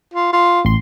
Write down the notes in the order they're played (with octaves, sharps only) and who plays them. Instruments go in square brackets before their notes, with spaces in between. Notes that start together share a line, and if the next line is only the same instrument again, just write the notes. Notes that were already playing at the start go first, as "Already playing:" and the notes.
[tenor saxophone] F4
F4
[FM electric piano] A1 C6